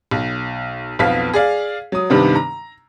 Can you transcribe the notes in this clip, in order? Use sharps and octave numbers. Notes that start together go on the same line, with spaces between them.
B1
B1 F2 B3 F5 B6
G#4 D5 F5
F#3 D#6
G2 C3 D#3 B3 D4
A#5